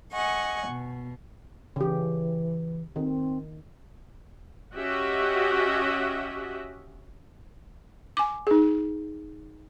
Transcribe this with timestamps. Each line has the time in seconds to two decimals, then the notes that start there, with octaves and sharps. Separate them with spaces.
0.13 D#5 F#5 G#5 C#6
0.68 B2
1.76 C#3 E3 G4
2.96 D#3 C4
4.75 C#4 F#4 G4 D#5 E5 F#5
8.17 G#5 D6
8.47 D#4 G#4